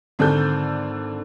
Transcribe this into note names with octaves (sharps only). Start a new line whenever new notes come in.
G#1 D3 A4 G6